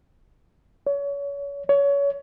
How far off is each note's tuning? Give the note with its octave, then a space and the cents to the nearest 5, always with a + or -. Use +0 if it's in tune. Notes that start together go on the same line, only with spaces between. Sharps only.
C#5 +30
C#5 +25